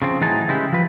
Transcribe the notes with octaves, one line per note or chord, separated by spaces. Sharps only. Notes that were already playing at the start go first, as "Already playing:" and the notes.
C#3 F3 C4
A2 E3 F#3 D#4 G#4 A5
C#3 E3 G#3 E4 G4
F3 B4